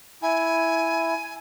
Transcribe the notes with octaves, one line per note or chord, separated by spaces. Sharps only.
E4 G#5